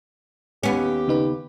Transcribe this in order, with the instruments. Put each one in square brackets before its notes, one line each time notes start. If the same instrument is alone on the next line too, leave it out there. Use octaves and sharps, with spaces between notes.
[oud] D#2 B3 C#4 [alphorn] G4
[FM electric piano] C#3 D#4 B4